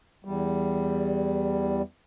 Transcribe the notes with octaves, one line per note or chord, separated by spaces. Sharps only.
E2 G3